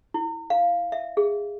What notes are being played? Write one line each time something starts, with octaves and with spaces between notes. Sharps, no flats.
E4
F5
E5
G#4